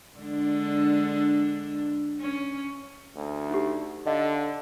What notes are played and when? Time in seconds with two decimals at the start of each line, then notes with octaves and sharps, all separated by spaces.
0.18 D3 G#3 D4
2.20 C#4
3.16 D2
3.50 D#4 G4
4.07 D3 D#5 F5